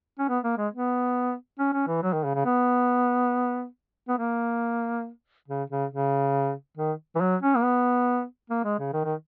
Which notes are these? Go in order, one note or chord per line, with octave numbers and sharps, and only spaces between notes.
C#4
B3
A#3
G#3
B3
C#4
C#4
E3
F#3
D#3
C#3
C#3
B3
B3
A#3
C#3
C#3
C#3
D#3
E3
F#3
C#4
A#3
B3
A#3
G#3
C#3
D#3
D#3